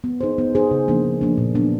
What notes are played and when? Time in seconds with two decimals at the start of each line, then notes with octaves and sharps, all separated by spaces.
0.04 B3
0.21 D#4 G#4 C5
0.38 B3
0.55 D#4 G#4 C5
0.71 C#3
0.88 F3 A#3 D4
1.04 C#3
1.21 F3 A#3 D4
1.38 A#2
1.55 F#3 B3 D4